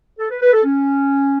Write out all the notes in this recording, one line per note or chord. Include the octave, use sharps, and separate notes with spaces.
A4
B4
B4
A4
C#4